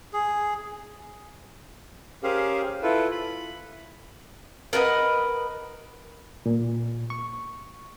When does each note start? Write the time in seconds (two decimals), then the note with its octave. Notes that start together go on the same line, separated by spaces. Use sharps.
0.13 G#4
2.23 C#4 G4 G#4 A#4 C5 F5
2.82 E4 F4 A4 B4
3.11 B5
4.73 A#4 B4 D#5 F#5
6.46 A#2
7.10 C#6